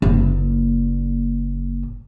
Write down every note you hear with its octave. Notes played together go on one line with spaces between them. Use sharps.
F#1 A#2